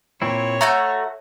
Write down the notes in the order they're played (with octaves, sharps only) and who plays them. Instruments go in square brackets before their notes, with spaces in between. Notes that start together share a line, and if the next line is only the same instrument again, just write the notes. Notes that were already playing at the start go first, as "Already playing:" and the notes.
[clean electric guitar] A#2 C4 E4 [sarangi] C#5
[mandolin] A3 F#4 G6 [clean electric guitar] A#5